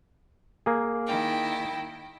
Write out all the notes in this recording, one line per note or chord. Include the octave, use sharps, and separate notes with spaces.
A#3 G#4
D#3 E4 G5